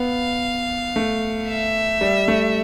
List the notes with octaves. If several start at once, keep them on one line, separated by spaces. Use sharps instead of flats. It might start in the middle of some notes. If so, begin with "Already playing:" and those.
Already playing: B3 F5
A3
E5
G3
A3